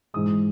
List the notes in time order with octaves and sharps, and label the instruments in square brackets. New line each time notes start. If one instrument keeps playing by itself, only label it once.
[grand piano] G#2 E3 G#3 D#6